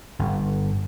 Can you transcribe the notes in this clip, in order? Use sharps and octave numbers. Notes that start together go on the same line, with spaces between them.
G1